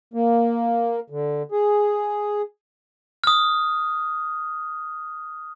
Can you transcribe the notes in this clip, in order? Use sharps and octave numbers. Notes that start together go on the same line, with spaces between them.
A#3
D3
G#4
D#6 F6